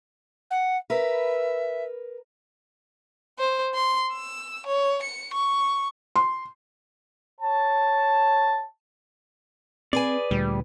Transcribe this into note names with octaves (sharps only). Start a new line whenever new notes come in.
F#5
A#4 B4 E5
C5
C6
E6
C#5
C#7
C#6
C6
C#5 A5
C4 G#4 B4 D5 G#5
D2 A#2 G3